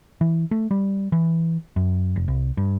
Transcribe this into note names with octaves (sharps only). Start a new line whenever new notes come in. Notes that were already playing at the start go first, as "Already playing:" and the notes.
E3
A3
G3
E3
F#2
F1
C2
G2